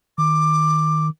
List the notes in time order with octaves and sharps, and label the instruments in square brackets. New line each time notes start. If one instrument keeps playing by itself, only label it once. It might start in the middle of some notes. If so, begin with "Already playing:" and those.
[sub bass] D#3 [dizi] D6